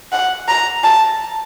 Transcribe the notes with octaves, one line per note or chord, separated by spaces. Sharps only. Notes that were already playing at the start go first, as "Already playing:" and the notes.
F#5
A#5
A5